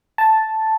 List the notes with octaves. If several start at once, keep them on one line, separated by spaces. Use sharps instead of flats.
A5